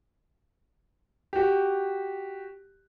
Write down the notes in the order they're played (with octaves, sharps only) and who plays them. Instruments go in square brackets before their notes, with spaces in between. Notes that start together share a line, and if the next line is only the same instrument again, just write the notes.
[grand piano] F#4 G4